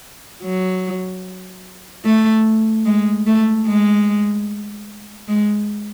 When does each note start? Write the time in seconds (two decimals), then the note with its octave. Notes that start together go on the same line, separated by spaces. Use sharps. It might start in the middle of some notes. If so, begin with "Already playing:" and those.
0.43 F#3
2.05 A3
2.86 G#3
3.27 A3
3.67 G#3
5.28 G#3